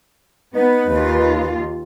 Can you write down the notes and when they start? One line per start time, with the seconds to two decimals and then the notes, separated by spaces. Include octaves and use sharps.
0.55 B3 D#4 B4
0.90 D#2 F4